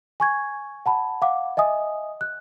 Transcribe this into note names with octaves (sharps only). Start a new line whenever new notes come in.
G#5 C#6 G#6
F#5 A5 B5
F5 F#5 D6
D#5 E5 G#5 D#6
F#6